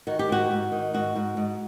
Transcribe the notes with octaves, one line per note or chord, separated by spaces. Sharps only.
D#3 F#4
G4
G#2 F#4
G#2
D#3
G#2 F#4
G#2
G#2